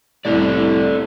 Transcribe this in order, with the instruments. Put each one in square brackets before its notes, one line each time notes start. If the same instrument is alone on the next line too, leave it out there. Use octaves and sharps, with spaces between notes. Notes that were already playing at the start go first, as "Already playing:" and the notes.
[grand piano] C2 A2 [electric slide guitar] G4 A4 D5